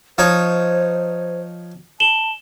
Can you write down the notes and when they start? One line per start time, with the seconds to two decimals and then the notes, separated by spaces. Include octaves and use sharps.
0.18 F3 D#4 C5 C#5
2.00 A5 E7 F#7 G7